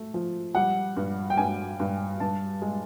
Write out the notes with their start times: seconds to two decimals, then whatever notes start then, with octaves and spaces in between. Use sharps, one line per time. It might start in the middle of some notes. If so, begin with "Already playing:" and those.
Already playing: A3
0.14 F3
0.55 G3 F#5
0.97 G2
1.30 G5
1.37 G2 G#5
1.80 G2
2.20 G2 A5
2.62 G#3